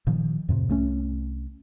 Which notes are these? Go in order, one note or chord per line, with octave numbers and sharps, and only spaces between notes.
A#2 D#3 F3
F2 A2 C3
C2 A3 C#4